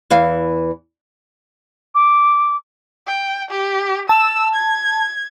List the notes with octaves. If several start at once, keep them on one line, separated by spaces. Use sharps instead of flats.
E2 E3 F5
D6
G5
G4
A5 E6
G#6